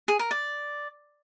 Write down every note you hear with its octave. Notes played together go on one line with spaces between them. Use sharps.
G#4
A#4
D5